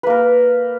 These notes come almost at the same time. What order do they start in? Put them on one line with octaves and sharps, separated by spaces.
B4 A#3 A#4